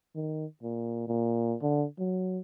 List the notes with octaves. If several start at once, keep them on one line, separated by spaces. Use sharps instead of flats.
D#3
A#2
A#2
D3
F#3